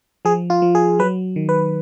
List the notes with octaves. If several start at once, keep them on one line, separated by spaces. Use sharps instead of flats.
F3 G#4
F4
F3
G#4
F#3 B4
D#3
B4